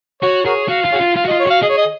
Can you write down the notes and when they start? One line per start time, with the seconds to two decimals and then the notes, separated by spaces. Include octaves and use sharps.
0.22 F#4 C#5
0.45 F#4 G#4 A#4 C#5
0.69 F#4 F5
0.85 F4
0.92 F#4 G#4 C#5 F5
1.01 F4
1.16 F4 F5
1.25 F#4
1.28 F4 D#5
1.40 C#5
1.47 F#4 F5
1.62 G#4 D#5
1.69 C#5
1.78 D#5